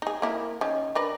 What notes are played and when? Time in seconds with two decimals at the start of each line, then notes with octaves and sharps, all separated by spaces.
0.02 D#4 G#4
0.22 A#3 E4 A#4
0.61 D#3 C#4
0.95 D4 A#4 B4